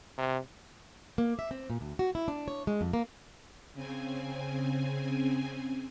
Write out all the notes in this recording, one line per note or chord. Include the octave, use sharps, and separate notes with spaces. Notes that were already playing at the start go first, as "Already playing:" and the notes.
C3
A#3
E5
C4
A#2
D2
F#4
E4
D4
C#5
G#3
F2
A#3
C#3 C4 G#5